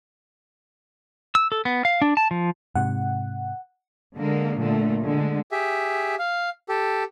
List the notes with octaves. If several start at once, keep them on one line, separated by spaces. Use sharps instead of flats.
E6
A4
B3
F5
D4
A5
F3
G#2 C3 F#5
D3 G#3 A#3
A#2 D3 A3
D3 G#3
G4 G#4 E5
F5
G4 A4